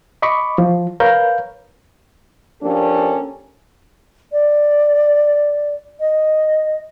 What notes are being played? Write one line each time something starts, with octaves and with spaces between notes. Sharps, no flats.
D#5 B5 C#6 D6
F3
A#4 B4 C#5 F5 G6
F3 A#3 C#4 D4 G4 A4
D5
D#5